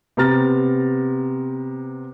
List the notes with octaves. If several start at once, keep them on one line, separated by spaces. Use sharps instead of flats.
C3 B3 A#5 F6 A6